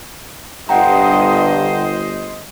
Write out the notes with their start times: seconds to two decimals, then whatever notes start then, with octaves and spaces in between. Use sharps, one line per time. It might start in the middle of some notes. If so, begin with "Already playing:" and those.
0.69 G1 G2 C5 D#5 F#5 G5 A#5